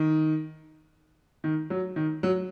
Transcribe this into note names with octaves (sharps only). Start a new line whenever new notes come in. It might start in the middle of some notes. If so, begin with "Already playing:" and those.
Already playing: D#3
D#3
F#3
D#3
F#3